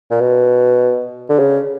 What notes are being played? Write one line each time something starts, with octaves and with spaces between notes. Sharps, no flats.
A#2
B2
D3
C#3